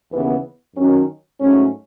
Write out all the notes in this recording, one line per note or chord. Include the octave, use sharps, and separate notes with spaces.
D#2 C#3 E3 B3
F#2 D#3 F#3 C#4
G#2 F#3 A3 C#4